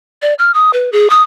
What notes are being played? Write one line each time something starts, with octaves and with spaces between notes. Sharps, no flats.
D5
F6
D#6
B4
G#4
D#6